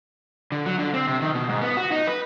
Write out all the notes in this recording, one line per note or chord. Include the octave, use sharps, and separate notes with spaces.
D3
F#3
D3
C4
C3
D#3
B2
G#2
B3
F#4
D#4
B4